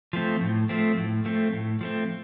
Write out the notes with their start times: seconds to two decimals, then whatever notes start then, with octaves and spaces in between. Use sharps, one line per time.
0.13 F3 A3 C4
0.41 A2
0.69 F3 A3 C4
0.97 A2
1.25 F3 A3 C4
1.53 A2
1.81 F3 A3 C4